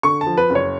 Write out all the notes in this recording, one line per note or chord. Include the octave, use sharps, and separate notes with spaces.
D3 C#6
A5
F3
B4
F#1
C#5